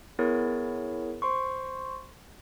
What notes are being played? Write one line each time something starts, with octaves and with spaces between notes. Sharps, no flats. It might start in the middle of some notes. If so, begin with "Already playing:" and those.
B3 E4 G#4 A#4 C#5
C5 C6 C#6